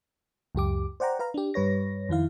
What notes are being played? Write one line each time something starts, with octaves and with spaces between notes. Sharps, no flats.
C#2 F#2 G4 D6
C5 D5 F#5 G5 A#5
B4 F5 A#5
D4 G4
G2 G3 B4 C#5 A#6
F2 D#3 E4 F5